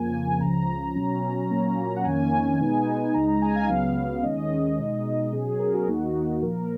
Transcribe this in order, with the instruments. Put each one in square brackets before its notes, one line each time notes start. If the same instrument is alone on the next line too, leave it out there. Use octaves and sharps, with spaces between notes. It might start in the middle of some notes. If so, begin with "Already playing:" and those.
Already playing: [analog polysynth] F2 C#3 F3 A#3 G#5
G#5
C#2 C#3 F3 A#5
B2 F#3 C#4
A#2 F#3 A#3 C#4
F#5
F2 D#3 A#3 C#4 G#5
B2 G#3 B3 D#4
C#2 C#3 G#3 D#4 A#5
A#5
G#5
F5
C#2 C#3 F#3 B3
D#2 D#3 G#3 C#4 D#5
B2 G#3 D#4
B2 F#3 C#4 G#4
A#4
F#4
D#2 D#3 A#3 D#4 F#4
A#2 F3 A#3 A#4